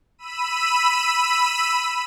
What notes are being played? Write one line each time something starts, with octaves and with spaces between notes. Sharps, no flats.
B5 E6 D#7